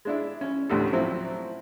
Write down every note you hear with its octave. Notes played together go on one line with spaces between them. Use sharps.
G#3 D4 E4
C#4
A1 D2 A2 C3 A4
F3 F#3 C4 E4